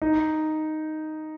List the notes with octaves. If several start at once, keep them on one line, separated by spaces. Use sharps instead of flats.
D#4